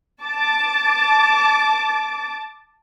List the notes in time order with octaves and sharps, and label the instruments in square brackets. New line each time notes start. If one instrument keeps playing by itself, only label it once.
[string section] A5 D6